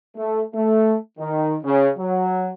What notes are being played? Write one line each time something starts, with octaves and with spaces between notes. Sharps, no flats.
A3
A3
D#3
C#3
F#3